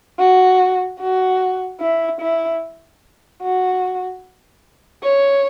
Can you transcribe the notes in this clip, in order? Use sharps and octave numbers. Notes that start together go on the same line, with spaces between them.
F#4
F#4
E4
E4
F#4
C#5